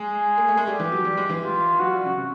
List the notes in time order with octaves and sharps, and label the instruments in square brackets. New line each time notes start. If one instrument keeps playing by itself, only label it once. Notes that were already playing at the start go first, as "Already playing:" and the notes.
Already playing: [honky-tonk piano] G#3 [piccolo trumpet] G#4
[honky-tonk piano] A#3
A3
G#3
[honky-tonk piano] G3 [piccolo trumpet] G4
[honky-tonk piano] E3
F#3
G3
G#3
E3
[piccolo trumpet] F4
[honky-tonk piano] F#3 [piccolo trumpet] F#4
[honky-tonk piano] G3
C#3
C3